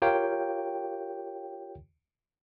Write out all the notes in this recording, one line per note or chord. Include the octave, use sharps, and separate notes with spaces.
F4 G4 A#4 C#5 F5 G5